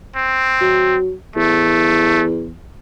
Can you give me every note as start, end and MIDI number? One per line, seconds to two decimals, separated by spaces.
0.16 0.96 60
0.61 1.12 54
1.36 2.52 40
1.36 2.23 57